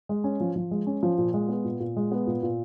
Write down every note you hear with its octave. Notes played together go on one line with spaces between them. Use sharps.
G#3
C#4
F3
F3
G#3
C#4
F3
A#2
G#3
B3
A#2
A#2
G#3
B3
A#2
A#2